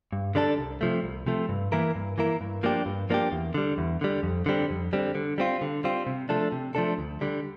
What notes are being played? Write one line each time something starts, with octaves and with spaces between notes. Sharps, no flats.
G2
D3 G3 D4 A4
C2
C3 F3 A3
C2
C3 F3 A3
G2
E3 A#3 E4 A#4
G2
E3 A#3 E4 A#4
G2
F3 A#3 D4 G4
G2
F3 A#3 D4 G4
E2
D3 G3
E2
D3 G3
F2
D3 G3 C4
F2
D3 G3 C4
D3
G3 C4 F4
D3
G3 C4 F4
C3
F3 A3 D4 A4
C3
F3 A3 D4 A4
D2
D3 G3